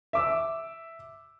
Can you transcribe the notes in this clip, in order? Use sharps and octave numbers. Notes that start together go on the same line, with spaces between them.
E5 D6 E6